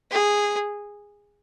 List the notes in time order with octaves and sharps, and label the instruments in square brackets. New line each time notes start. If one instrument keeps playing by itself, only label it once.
[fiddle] G#4